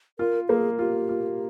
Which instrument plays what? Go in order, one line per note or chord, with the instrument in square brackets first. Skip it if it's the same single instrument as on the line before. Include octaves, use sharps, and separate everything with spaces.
[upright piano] F4 [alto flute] A#4
[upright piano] A#3 [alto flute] G#4
[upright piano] F4 [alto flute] G4
[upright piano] F4